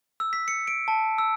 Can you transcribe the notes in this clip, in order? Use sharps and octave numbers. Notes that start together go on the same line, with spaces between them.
E6
B6
C#7
D7
A5
E6